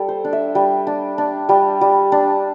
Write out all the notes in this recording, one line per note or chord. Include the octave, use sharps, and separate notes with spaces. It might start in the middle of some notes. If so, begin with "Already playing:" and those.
Already playing: G3 A4
C5
D4
E5
G3
D4
D4
G3
G3
D4